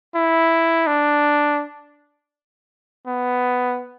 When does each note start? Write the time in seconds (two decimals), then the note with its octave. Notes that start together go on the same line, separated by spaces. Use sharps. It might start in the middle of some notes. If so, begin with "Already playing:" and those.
0.15 E4
0.87 D4
3.06 B3